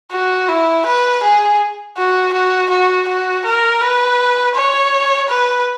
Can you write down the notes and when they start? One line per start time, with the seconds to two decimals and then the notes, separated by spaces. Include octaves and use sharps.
0.12 F#4
0.49 E4
0.86 B4
1.23 G#4
1.97 F#4
2.33 F#4
2.70 F#4
3.08 F#4
3.45 A#4
3.82 B4
4.55 C#5
5.29 B4